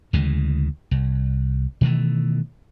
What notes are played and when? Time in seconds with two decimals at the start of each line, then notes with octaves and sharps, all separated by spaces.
0.13 D2 C#3 E3 G#3
0.91 C2
1.81 B2 D#3 E3 A3